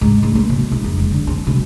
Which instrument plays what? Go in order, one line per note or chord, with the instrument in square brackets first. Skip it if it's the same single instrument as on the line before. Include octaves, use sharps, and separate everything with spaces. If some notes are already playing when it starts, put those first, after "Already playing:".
[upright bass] G#2
D1
A#3
B2
E3
F2
E1
D3
C4
B2